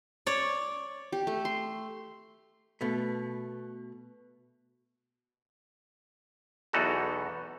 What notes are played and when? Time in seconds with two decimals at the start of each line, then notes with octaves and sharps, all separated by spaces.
0.26 C#5 D5
1.12 G4
1.27 A3
1.45 C6
2.81 B2 A3
6.73 B1 E2 E3 D#4 F#4 A4